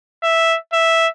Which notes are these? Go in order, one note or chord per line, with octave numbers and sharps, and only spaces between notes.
E5
E5